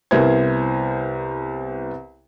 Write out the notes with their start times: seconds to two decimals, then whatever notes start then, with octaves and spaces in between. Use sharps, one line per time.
0.11 C2 B3 E4 A#4 C5 G#6